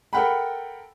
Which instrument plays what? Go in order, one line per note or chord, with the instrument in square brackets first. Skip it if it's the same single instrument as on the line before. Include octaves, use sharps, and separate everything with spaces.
[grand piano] A4 A#4 F#5 G5 B5